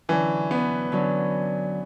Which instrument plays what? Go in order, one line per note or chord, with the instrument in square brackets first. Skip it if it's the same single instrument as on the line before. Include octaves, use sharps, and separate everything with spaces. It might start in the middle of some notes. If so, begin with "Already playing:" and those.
[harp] D3 F#3 C#4 [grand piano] E3
[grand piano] B3
[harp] D3 F#3 C#4